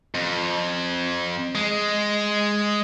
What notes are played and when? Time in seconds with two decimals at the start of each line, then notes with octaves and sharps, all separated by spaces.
0.15 F2
1.55 G#3